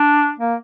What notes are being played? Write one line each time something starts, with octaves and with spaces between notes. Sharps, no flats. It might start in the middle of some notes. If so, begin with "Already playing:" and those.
Already playing: D4
A#3